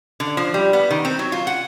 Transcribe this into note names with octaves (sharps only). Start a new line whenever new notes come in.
D3
F3
G3
B3
D#3
C4
F#3
F4
F#5